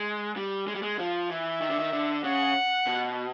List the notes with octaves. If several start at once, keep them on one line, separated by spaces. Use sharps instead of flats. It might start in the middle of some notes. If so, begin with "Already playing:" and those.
Already playing: G#3
G3
G#3
G3
G#3
F3
E3 E5
D#3
D3
D#3
D3
C#3 F#5
B2